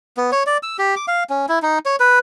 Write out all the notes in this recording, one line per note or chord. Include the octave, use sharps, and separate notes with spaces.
B3
C#5
D5
E6
G4
D6
F5
C#4
E4
D#4
C#5
B4